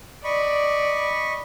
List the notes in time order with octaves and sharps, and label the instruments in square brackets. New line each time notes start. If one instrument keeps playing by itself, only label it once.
[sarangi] D5 [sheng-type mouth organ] D#5 B5 C#6